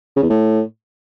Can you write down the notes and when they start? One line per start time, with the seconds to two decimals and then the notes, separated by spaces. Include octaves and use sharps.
0.16 C#3
0.23 E2
0.30 A2